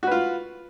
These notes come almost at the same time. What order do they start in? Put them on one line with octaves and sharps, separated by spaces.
F#4 B4 F4